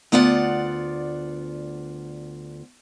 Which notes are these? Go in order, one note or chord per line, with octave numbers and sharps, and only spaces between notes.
D2 B3 F4 D5 F#5